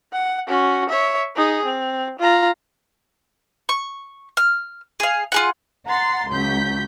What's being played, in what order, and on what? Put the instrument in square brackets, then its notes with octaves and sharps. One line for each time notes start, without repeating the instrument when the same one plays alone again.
[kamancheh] F#5
C#4 F#4
C#5 E5
D#4 G#4
C4
F4 A#5
[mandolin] C#6
F6
G#4 F5
F4 G#4 F#5
[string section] F#5 A#5 C6 A6 C7
C#2 F#3 G6 B6